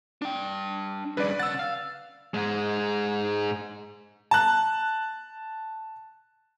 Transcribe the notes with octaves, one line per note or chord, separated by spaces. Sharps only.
D4 G5
G2 C#3 B4 D5
C#3 F#5 E6 A6
F5
G#2 G#3
A5 F#6